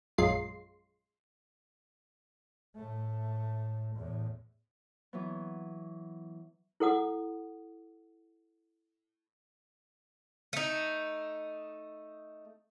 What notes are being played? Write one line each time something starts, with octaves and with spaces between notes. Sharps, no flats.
A#1 F#2 G#3 F4 C6 C7
A2 A3
E2 A2
E3 F#3 B3
E4 A4 F#5 D#6
A3 D#4